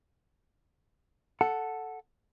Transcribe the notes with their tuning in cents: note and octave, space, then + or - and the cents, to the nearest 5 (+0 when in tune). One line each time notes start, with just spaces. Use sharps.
A4 +0 F#5 +0